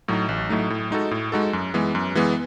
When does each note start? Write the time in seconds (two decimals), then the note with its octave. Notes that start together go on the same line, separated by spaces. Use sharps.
0.08 A2 F#3 A3 D#4
0.29 A1
0.49 A2 F#3 A3 D#4
0.70 A2
0.90 G#3 D#4 F#4 A4
1.11 A2
1.32 G#3 D#4 F#4 A4
1.53 F#2
1.74 E3 G#3 B3
1.95 F#2
2.15 E3 G#3 B3